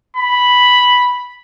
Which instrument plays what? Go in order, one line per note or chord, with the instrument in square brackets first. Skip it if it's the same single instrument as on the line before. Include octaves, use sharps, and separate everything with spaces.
[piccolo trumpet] B5